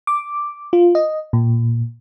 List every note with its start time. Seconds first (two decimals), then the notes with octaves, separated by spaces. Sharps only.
0.07 D6
0.73 F4
0.95 D#5
1.33 A#2